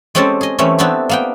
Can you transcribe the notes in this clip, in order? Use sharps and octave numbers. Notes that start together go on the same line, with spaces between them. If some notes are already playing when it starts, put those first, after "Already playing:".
G#3 C4 C#4 G4 A4 D5
G#4 D#5
E3 G3 A3 C4 C#4
B3 C4 D4 E4 G4
A#3 B3 G5